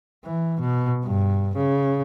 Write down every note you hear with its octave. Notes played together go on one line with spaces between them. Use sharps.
E3
B2
G2
C#3